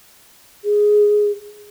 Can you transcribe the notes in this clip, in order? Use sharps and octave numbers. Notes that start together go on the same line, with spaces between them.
G#4